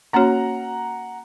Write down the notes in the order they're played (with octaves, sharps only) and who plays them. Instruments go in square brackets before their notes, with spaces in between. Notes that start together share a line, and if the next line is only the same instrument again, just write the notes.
[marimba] A#3 C#4 F#4 C#5 [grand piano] F#5 A#5